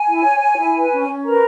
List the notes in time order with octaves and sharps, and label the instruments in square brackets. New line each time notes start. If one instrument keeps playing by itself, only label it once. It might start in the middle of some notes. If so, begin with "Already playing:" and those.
Already playing: [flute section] G#5
E4
C#5
C#5
E4
B4
C#4
C#4
A#4 B4 A#5